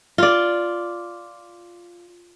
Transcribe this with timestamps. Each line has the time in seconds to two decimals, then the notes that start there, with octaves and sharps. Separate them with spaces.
0.18 F4 D5